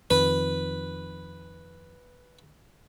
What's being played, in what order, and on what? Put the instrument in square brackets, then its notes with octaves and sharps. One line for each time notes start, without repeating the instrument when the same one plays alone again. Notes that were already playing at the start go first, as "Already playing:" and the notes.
[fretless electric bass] F2 D#3 [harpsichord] B4